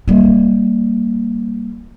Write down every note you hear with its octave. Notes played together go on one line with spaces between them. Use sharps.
G3 A#3